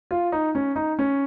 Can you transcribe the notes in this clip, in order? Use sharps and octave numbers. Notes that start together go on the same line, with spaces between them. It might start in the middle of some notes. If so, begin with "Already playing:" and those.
F4
D#4
C#4
D#4
C#4